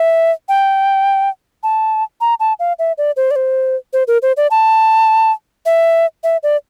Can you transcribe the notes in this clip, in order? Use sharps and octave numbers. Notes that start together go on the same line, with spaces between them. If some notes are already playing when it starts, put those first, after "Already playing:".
Already playing: E5
G5
A5
A#5
A5
F5
E5
D5
C5
D5
C5
C5
A#4
C5
D5
A5
E5
E5
D5